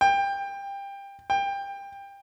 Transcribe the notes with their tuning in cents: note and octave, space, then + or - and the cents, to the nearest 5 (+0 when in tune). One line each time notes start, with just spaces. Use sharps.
G5 +20
G5 +20